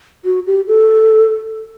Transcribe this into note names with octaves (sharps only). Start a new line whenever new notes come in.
F#4
G4
A4